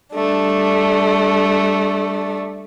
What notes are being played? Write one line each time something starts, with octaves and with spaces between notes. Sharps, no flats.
G3 A3 D4